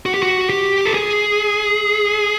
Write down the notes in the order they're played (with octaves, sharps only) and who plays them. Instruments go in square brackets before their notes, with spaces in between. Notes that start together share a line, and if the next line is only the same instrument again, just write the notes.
[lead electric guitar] F#4
G4
F#4
G4
A4
G#4